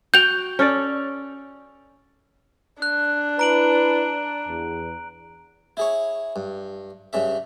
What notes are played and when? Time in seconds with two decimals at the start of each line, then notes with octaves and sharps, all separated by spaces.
0.14 F#4 G5 G6 F7
0.59 C#4 A4 D5
2.82 D4 F#6
3.39 E4 B4 A#5 D7 F#7
4.48 E2
5.77 E4 G#4 C#5
6.36 G2
7.13 G2 C#3 E5